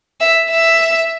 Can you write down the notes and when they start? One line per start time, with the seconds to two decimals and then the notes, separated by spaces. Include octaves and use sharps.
0.21 E5
0.51 E5